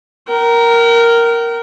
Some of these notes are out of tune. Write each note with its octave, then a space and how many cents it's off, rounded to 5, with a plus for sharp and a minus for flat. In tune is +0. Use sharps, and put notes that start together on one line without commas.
A#4 +0 G5 -40